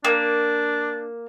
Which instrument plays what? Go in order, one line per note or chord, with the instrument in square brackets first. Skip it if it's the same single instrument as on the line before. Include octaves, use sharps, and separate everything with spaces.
[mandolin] A#3 [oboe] D4